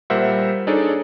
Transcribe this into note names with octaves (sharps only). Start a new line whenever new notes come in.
A#2 G3 A#4 C5 E5 F#5
D4 D#4 G#4 A4 C#5 D5